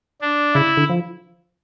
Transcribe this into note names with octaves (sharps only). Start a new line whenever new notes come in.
D4
C#3 E4
D3
F3